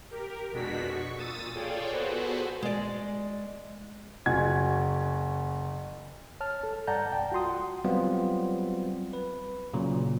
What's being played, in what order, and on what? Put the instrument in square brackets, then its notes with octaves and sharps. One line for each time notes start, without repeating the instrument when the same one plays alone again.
[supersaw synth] G4 A#4
F2 B2 G#3 D4 F#4 B6
C#6
A#2 D#6 E6 A6 D#7
F4 G#4 A4 C#5 D5 G5
B3 F#4 G#4 A4 B4 C5
[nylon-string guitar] G#3 D5
[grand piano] F#1 F#4 G#5 G#6
[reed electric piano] C#5 A5 F6
A4
G2 D5 F#5 A5 A#5 G6
C2 G5 A5
F4 F#4 C6 D#6
F#5
[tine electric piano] F#3 G3 B3 C4 F4
B4
A#2 C#3 F#3